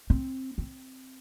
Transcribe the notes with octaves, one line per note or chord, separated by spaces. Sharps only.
C4
C4